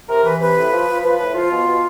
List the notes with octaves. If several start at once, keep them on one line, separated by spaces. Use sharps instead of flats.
C3 A#4
E3 B4
C3 B4
A2
F3
F3
F3 B4
A2 B4
F3 F4
B2
B2